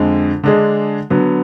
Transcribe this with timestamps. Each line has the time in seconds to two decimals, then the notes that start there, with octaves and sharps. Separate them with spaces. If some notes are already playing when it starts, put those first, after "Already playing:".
Already playing: F2 D3 G#3
0.44 D3 G#3 D4 G#4
1.10 D3 F#3 B3